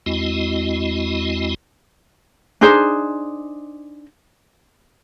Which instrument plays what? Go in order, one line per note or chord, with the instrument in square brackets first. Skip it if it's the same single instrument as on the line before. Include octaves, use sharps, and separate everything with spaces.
[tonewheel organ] E2 G#3 C4 E4 F#4 D#5
[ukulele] D4 D#4 G#4 C5